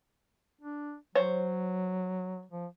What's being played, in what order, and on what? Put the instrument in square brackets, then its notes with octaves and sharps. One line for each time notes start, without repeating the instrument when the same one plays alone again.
[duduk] D4
[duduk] F#3 [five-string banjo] C5 C#5
[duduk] F3